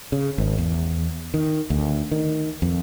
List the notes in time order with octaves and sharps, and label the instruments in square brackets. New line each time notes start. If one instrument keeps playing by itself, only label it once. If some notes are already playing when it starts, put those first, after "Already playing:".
[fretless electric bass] C#3
G#1
E2
D#3
D2
D#3
F2